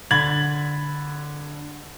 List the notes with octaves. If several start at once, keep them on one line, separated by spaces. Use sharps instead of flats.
D3 B5 G#6 A6 F#7